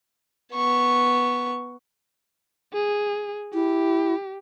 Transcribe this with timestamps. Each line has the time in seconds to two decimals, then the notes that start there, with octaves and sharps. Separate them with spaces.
0.54 B3 C#6
2.73 G#4
3.54 E4 G4